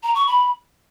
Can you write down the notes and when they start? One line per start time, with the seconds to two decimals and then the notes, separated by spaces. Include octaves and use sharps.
0.03 A#5
0.15 C#6
0.27 B5